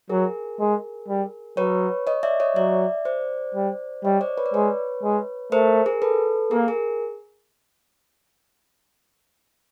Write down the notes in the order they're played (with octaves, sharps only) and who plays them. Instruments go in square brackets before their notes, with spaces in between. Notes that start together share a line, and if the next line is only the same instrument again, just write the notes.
[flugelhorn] F#3 [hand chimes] G#4 A#4
[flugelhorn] G#3
G3
[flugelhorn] F#3 [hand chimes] B4 C#5
[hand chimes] C#5 D#5
D5 E5
C#5 D#5
[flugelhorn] F#3 [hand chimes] D5 E5
[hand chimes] C5 D5
[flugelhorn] G3
[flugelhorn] G3 [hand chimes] C#5 D#5
[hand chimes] C5 D5
B4 C#5
D5
[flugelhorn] G#3 [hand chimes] B4 C#5
[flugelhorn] G#3
[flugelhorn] A3 [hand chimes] A#4 C5
[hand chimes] G#4 A#4
A4 B4
[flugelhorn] A#3 [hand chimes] G#4 A#4
[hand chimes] G#4 A#4